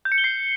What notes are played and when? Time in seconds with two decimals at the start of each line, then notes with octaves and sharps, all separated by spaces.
0.05 G6
0.12 C#7
0.18 G7
0.24 C7